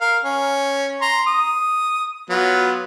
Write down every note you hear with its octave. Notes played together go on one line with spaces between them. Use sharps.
A#4 F5
C#4
A#5 C6
D#6
F#3 B3 F4